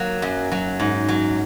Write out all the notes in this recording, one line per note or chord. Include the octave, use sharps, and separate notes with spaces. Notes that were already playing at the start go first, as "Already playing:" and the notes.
Already playing: F#3 A#3
F#2
F#3
G#2
F#3